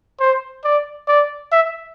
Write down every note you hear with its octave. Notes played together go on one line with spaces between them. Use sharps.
C5
D5
D5
E5